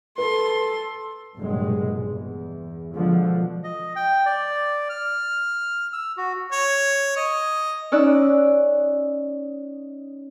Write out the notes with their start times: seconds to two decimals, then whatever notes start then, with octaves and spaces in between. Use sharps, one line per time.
0.18 A4 B4 C6
1.37 F1 B1 G2 A#2 F#3 G#3
1.98 E2
2.93 B2 D3 F3 G#3
3.64 D#5
3.96 G5
4.26 D5
4.89 F6
5.93 E6
6.17 F#4
6.52 C#5
7.17 D#5
7.92 C#4 D#4 D5 E6 F#6